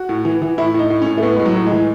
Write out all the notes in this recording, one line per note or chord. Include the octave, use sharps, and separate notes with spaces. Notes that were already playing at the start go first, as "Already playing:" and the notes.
Already playing: F#4
A2
E3
E3
A2 E4
A2 D#4
A2
A2 C#4
A3
A2 B3
A2 G#3
F#3
A2
G#3
E3